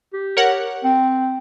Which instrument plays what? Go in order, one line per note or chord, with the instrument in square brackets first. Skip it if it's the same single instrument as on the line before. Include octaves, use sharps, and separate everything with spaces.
[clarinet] G4
[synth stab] A#4 C#5 F#5
[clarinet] C4